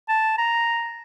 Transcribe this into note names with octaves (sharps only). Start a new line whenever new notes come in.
A5
A#5